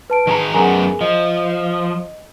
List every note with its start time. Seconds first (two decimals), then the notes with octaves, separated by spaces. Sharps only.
0.10 B4 A5 D7
0.27 D#3 G#4 A#5
0.54 F#2 D#3 B3 G#4 A#4 G#5
1.01 F3 D#5